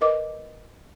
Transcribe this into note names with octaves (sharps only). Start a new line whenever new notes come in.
A#4 B4 D#5 D6